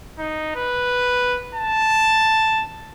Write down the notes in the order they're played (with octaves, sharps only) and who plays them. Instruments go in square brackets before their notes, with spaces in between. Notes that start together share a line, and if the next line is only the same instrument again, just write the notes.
[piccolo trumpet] D#4
B4
A5